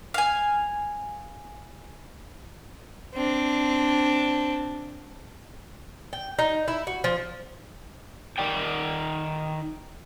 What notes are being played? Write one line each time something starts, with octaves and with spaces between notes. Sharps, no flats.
F5 G#5
C4 D4
G5
D#4
E4
F#4
F3
D#3 D5 G5